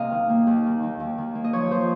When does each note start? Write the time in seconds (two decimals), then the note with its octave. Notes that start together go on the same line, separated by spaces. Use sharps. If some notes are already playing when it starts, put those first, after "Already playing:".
Already playing: C3 A#3 D#5 F5
0.11 D#3
0.29 A#3
0.47 D#2
0.65 D#3
0.83 D#3
1.00 D#2
1.18 D#3
1.35 A#3
1.44 D#5
1.53 F3 C#5
1.71 F3 C5